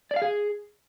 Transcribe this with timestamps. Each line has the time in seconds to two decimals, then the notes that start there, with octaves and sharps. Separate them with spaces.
0.11 D5
0.16 F5
0.22 G#4